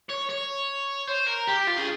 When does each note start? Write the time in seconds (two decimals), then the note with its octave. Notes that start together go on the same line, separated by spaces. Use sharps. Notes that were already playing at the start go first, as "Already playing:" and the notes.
0.09 C#5
0.29 C#5
1.08 C5
1.27 A#4
1.47 G4
1.67 F4
1.77 G#4